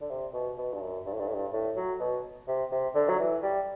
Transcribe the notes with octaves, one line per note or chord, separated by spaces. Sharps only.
D3
C3
B2
B2
G2
F#2
G2
A2
G2
A2
G2
A2
F#3
B2
C3
C3
D3
F#3
E3
G3